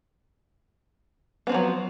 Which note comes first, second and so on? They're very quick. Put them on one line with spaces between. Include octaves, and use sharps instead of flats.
B3 C4 F3 F#3